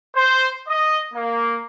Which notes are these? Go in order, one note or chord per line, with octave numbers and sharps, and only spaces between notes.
C5
D#5
A#3